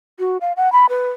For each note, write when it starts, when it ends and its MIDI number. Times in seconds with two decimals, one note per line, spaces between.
0.19 0.37 66
0.41 0.52 77
0.57 0.72 78
0.72 0.86 83
0.89 1.10 71